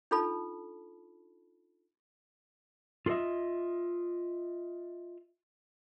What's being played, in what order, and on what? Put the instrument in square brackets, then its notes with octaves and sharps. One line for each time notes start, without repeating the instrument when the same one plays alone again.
[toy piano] D4 D#4 F4 A4 A5 B5
[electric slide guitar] F4 G#4 A4 D#5 E5